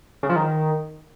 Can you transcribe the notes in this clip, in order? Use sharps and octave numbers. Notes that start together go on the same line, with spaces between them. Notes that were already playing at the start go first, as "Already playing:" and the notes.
C#3
F3
D#3